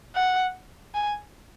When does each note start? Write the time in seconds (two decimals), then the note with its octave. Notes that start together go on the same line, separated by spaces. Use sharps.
0.16 F#5
0.95 G#5